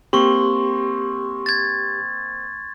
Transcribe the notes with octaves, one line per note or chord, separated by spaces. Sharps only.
A#3 C4 G4 C6 C#6
G#6 A6